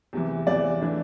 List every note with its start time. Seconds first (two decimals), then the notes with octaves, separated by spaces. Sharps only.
0.13 E2 C3 E3
0.47 E2 C3 E3 D5
0.81 E3 A3 D4